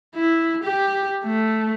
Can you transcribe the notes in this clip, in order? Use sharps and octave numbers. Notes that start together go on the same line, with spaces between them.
E4
G4
A3